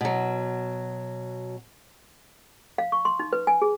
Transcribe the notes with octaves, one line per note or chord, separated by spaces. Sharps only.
B2 F#3
F5
C#6
C6
D#4
B4
G#5
G#4